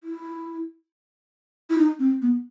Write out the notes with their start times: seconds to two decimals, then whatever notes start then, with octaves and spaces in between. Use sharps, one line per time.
0.04 E4
1.70 E4
1.78 D#4
2.00 C4
2.22 B3